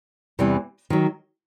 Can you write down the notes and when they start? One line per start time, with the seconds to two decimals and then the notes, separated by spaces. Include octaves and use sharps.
0.39 E2 C3 E3 G3
0.90 D#3 F#3